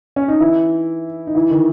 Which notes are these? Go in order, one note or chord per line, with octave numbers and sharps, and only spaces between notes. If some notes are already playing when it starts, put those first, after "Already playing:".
C#4
D#4
E3 E4
D#4
E3 E4
D#3 D#4